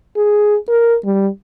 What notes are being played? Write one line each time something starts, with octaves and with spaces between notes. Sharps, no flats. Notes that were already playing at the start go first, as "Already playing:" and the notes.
G#4
A#4
G3